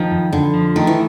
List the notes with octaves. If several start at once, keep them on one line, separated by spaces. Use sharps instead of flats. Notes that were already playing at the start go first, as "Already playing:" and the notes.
Already playing: D#3 F3
F2
F2 D3
F3
D#3 A3
E3